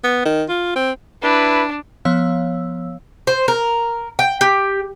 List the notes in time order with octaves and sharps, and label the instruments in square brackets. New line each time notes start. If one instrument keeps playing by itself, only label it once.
[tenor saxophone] B3
D#3
F4
C4
[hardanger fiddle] D4 [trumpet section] E4 B4
[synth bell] F3 B3 C#5 F5 E6
[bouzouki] C5
A#4
G5
G4